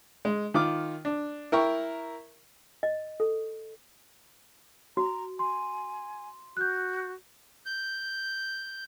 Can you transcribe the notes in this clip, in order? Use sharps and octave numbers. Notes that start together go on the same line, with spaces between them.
G#3
D#3 F4 D6 F6
D4
E4 A#4 G5 C#6
D#5
A4
F#4 A#5
G#5 C6
F#4 F#6 G6
G6